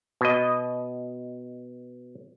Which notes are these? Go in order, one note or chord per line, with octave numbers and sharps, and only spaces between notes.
B2 D#5